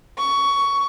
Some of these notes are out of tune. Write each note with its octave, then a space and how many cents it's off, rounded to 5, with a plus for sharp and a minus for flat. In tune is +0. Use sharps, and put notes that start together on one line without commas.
C#6 +15